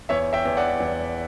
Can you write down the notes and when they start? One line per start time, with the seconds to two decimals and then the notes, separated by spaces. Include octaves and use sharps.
0.09 E2 C#5 E5
0.33 E5 G5
0.45 E2
0.57 D5 F#5
0.80 E2